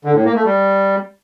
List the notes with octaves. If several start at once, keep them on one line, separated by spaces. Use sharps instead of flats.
D3
A2
A#3
A3
G3